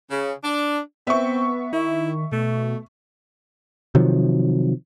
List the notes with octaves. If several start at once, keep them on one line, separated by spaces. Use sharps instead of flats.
C#3
D4
B3 C4 E5 C#6
D#3 E4
B2 A3
C3 D#3 F3 F#3